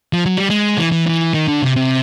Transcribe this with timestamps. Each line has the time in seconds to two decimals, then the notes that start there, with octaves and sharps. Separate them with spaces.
0.13 F3
0.26 F#3
0.37 G3
0.50 G#3
0.78 E3
0.92 E3
1.06 E3
1.34 D#3
1.48 D3
1.62 C3
1.76 C3